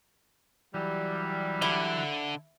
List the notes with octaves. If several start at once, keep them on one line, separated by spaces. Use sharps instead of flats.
E3 F#3 G3
D3 E4